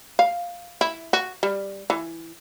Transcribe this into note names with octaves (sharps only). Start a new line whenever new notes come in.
F5
E4
F#4
G3
E3